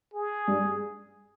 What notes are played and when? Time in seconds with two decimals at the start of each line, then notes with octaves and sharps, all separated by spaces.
0.14 G#4
0.48 G2